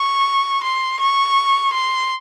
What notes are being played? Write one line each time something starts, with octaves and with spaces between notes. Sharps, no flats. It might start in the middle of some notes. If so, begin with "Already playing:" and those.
Already playing: C#6
C6
C#6
C6